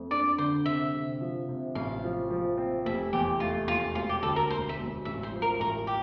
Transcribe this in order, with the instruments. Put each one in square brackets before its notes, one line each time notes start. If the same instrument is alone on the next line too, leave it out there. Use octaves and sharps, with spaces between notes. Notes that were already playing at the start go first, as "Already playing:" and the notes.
Already playing: [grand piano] F2 A3
[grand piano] D4 [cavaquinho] D5
[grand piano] D3 [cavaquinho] C5
[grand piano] C3 [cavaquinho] E5
[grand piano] C3
F3
C3
[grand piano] A1 [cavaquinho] F5
[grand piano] F3
F3
C4
[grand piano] F1 [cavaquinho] E5
[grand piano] E2 [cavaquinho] G4
[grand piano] A3 [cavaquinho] F4
[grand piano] F1 [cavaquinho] F4
[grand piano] E1 [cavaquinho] F4
[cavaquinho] G4
[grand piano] D2 [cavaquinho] A4
[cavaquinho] A#4
[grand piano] E1 [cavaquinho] C5
[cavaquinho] E5
[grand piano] E1
[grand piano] A1 [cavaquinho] E5
[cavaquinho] C5
[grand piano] F3
[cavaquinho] A#4
[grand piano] A1 [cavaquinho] A#4
[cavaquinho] G4